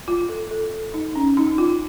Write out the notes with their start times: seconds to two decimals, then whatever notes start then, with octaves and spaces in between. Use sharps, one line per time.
0.08 F4
0.29 A4
0.51 A4
0.94 D#4
1.16 C#4
1.37 D#4
1.58 F4